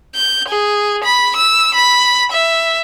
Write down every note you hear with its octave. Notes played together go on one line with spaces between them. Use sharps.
G6
G#4
B5
E6
B5
E5